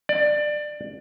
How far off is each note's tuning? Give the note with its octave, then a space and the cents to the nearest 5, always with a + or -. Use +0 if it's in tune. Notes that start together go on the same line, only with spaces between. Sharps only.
D5 +20